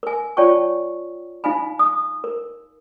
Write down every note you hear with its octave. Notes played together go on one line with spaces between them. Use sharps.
A#4 G#5
F4 C#5 D5 G5 A5 C#6
D#4 F5 G#5 B5
D#6
A#4